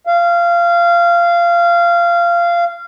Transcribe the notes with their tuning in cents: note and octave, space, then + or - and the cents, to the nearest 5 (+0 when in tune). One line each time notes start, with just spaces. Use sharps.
F5 -20